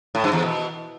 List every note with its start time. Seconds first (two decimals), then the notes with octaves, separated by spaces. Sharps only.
0.15 A2
0.24 G2
0.33 E2
0.42 B2